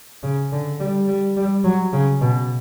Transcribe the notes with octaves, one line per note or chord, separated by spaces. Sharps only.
C#3
D3
G3
G3
G3
F#3
C#3
B2